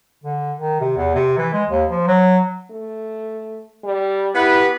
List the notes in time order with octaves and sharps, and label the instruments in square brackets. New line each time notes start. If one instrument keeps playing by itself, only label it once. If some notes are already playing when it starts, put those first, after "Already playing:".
[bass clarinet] D3
D#3
C3
E2
C3
E3
G#3
D#2
F3
F#3
[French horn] A3
G3
[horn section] B3 G4 B4 [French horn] E4